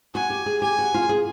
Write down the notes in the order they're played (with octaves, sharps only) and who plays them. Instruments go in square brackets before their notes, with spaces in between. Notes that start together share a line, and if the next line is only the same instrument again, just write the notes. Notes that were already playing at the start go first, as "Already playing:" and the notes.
[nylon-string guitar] F#4 [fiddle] G#5
[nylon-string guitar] G4
G#4
[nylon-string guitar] G4 [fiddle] G#5
[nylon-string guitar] F#4
F4
G#4